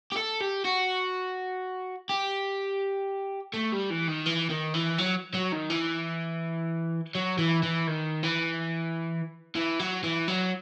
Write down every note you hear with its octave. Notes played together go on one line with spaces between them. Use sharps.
G4
A4
G4
F#4
G4
A3
G3
E3
D#3
E3
D#3
E3
F#3
F#3
D#3
E3
F#3
E3
E3
D#3
E3
E3
F#3
E3
F#3